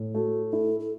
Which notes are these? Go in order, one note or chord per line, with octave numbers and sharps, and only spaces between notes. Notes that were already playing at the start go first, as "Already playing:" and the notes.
Already playing: A2
A3 F#4
E4 A4
A4